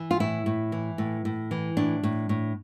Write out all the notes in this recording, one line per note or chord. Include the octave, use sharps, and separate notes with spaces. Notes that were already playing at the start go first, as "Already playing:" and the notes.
Already playing: E3
F4
A2 E4
A2
E3
A2
A2
E3
A2 D4
A2
A2